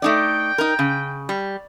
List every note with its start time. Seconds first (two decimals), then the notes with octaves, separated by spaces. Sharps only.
0.02 A3 D#4 D5 G5
0.58 D#4 A#4
0.79 C#3
1.29 G3